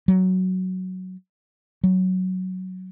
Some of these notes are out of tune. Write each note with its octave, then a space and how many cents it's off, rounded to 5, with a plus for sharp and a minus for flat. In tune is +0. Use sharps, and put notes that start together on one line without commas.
F#3 +5
F#3 +5